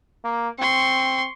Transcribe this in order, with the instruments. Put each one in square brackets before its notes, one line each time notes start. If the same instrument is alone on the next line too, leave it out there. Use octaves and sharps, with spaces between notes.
[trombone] A#3
[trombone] C4 [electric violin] C6 C#6